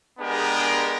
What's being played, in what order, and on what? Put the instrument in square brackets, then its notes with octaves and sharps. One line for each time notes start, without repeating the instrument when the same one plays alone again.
[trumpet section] G#3 B3 D4 G4 G#4 A#4